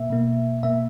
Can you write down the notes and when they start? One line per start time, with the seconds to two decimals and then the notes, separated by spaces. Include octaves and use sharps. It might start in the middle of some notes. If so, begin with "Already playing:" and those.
Already playing: B2 A#3 E5
0.10 B2 A#3
0.63 B2 A#3 E5